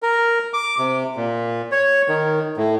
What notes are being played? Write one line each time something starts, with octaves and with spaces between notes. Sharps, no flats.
A#4
D6
C3
A#2
C#5
D#3
A2